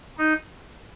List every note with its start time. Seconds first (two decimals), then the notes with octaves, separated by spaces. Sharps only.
0.18 D#4